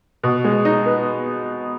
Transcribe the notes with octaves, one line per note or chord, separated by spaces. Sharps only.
B2
G#3
D#4
B3